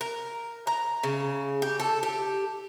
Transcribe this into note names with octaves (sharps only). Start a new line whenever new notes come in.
A#4
A#5
C#3
G4
A4
G4